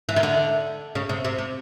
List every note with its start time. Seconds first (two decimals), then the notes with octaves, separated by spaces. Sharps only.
0.09 E3
0.16 D#3
0.23 D3
0.95 C#3
1.09 C3
1.25 C3
1.38 C3